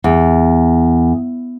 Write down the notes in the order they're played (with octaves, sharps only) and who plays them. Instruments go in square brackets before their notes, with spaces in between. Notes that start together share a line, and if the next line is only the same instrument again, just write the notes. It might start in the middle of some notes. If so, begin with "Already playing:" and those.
[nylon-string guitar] E2